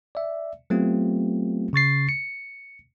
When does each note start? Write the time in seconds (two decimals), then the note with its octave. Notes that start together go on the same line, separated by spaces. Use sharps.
0.15 D5 E5
0.70 F#3 A3 B3 C4 F4 G4
1.73 C#3 C#6 A6 C7
2.09 C#7